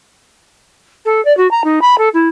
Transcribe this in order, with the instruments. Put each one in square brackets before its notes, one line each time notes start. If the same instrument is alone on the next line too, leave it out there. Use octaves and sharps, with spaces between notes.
[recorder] A4
D5
F#4
A#5
D#4
B5
A4
E4